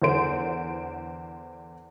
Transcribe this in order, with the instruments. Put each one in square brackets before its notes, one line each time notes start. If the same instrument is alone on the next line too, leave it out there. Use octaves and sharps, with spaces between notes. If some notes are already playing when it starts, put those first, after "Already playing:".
[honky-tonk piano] E2 D3 C5 D7